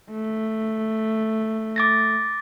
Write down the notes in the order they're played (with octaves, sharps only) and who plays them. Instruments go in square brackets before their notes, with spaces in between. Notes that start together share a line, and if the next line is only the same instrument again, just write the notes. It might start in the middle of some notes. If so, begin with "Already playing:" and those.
[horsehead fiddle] A3
[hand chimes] D6 A6 A#6